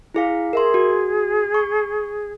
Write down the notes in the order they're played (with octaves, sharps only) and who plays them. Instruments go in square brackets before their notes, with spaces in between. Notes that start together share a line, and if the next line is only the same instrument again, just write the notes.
[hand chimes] E4 G#4 F5
[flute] G#4 [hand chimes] A#4 E5 C6
[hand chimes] F#4
C#6